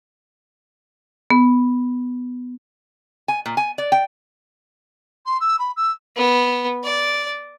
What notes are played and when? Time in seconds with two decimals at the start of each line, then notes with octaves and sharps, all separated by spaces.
1.30 B3
3.28 G#5
3.46 A#2
3.57 G#5
3.78 D5
3.92 G5
5.26 C6
5.40 E6
5.59 B5
5.76 E6
6.17 B3
6.84 D5